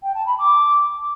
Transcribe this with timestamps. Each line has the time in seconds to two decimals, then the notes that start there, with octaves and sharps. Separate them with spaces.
0.03 G5
0.15 A5
0.27 B5
0.38 D6